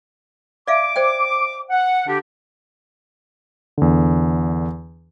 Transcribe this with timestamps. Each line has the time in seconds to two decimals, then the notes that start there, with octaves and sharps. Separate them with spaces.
0.68 D5 E5 F5 D6
0.96 C5 D5 G5
1.70 F#5
2.07 D3 D4 G4
3.78 E2 D3